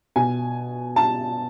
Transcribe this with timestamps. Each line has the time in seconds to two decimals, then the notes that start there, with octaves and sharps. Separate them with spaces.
0.16 B2 G#5
0.96 A5